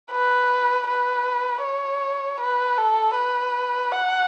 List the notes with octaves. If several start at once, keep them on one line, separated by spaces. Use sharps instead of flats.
B4
B4
C#5
B4
A4
B4
F#5